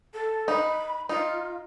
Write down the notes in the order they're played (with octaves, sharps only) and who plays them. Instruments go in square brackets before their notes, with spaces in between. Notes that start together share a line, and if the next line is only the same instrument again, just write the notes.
[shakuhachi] A4
[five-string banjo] D#4 [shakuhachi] B5
[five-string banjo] D#4 [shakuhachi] F4